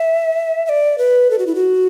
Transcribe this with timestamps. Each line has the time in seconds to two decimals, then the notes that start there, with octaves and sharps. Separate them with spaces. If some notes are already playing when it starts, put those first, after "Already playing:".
Already playing: E5
0.66 E5
0.69 D5
0.98 B4
1.31 A4
1.39 F#4
1.47 E4
1.55 F#4